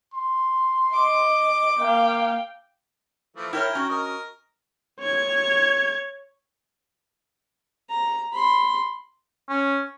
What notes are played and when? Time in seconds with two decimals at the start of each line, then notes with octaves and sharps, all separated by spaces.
0.14 C6
0.94 D#5 D6
1.79 A#3 F5 G5
3.36 E3 F3 A3
3.53 E4 A#4 C#5 G5 A#5 F6
3.75 C#4 F#4
3.90 A#4 D#5
5.00 C#5 G#6
7.90 A#5
8.33 B5 C6
9.49 C#4